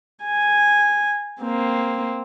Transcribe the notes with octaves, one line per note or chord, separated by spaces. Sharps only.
G#5
A#3 C4